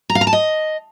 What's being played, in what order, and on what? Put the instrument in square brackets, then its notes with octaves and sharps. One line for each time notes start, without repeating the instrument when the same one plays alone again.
[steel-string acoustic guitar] A#5
F5
A#5
A5
D#5